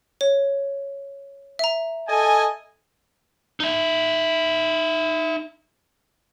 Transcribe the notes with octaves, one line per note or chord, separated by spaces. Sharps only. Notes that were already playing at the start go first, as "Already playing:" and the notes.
C#5
E5 A#5
A4 D#5 G#5
D#4 E5